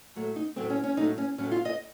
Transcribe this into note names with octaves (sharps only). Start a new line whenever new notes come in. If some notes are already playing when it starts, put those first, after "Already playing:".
A2 F#3 A3
D#4
A2 F#3 A3 C4
C#4
C#4
A2 F#3 A3 D#4
C#4
A2 F#3 A3 C#4
F4
D#5